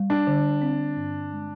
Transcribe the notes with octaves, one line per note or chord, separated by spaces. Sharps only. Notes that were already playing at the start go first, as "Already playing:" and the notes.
Already playing: G3
D4
D3
C4
G2
G#3